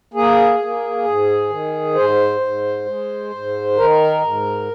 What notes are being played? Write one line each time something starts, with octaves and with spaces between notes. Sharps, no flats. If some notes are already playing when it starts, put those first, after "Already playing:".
A#3 G#4
A#3
G#2
D#3
G#2 C5
G#2
G#3
G#2
D#3 A#4
G#2